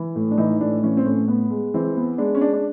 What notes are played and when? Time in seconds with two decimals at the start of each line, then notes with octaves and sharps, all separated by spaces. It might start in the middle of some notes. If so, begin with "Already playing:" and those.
Already playing: E3
0.16 A2
0.31 D4
0.38 E3 D#4
0.61 A2 D4
0.83 E3 C#4
0.97 C4
1.06 A2 C#4
1.28 B3
1.50 G#3
1.74 E3 C4
1.97 B3
2.18 G#3 D4
2.35 C#4
2.41 G#3 D4
2.53 D4